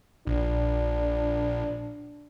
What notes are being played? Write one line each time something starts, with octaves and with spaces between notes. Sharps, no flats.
A#1 D4